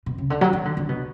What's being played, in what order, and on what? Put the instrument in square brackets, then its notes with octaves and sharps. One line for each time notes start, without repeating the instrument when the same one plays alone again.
[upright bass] B2
C#3
D3
F#3
F#3
D3
D3
B2